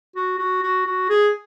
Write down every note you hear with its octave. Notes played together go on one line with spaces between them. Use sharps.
F#4
F#4
F#4
F#4
G#4